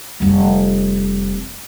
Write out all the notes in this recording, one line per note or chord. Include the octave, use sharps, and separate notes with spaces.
F1 G3